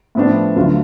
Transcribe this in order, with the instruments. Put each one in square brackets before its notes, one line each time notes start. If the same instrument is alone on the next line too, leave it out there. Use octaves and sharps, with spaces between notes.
[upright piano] A2 F3 B3 D4
D2 D3 F#3 A3 F4